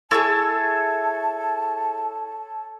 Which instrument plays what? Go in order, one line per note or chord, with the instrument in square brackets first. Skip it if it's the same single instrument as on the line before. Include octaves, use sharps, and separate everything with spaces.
[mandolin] E4 F#4 G#4 [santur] A4 C#5 E6 [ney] A5